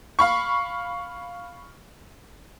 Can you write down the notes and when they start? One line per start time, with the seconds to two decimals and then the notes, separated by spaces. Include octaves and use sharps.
0.19 F5 B5 C#6